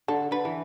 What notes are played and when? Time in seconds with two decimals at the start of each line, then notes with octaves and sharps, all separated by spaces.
0.08 D3 A4
0.31 D3 B4
0.45 E3